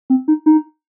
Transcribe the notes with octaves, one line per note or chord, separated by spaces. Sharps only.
C4
D#4
D#4